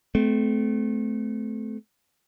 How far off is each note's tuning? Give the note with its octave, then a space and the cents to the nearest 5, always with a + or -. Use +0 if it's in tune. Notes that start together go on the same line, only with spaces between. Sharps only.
A3 -25 C4 -35